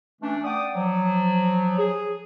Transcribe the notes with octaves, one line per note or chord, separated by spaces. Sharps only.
E3 A3 C#4 D4
D5 F#5 G5 D6 D#6
F3 F#3
G#4